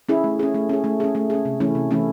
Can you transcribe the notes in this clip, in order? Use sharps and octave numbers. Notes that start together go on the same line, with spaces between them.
C#4 E4 G#4
A3
C#4 G#4
A3
C#4 G#4
A3
C#4 G#4
A3
C#4 G#4
C3
E3 A3 C#4 E4
C3
E3 A3 C#4 E4